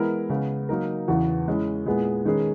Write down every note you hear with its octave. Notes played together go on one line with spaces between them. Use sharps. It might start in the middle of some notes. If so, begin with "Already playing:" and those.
Already playing: E3 G#3 B3 E4 A#4
C#3 G#3 B3
F#3 A#3 D#4 A#4
E2 C#3 E3 B3 F#4
G#3 C#4 E4
A#2 G#3 B3 E4 G#4
D#3 G#3 C#4 G#4 B4